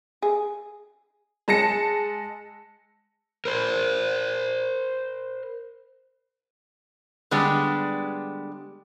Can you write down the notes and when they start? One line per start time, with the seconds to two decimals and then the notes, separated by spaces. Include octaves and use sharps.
0.22 G#4
1.48 G#3 A5 A#6 C#7
3.45 A#4 C5
7.31 D3 G3 G#3 B3 D4 G4